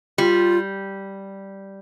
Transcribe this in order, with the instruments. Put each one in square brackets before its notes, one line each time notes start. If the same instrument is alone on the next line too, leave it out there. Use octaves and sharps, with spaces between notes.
[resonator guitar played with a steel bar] G3 [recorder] F4